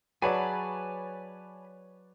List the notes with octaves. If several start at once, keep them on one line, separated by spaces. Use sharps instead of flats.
F#3 G#4 B4 C#5 D5 G#5 A5 B5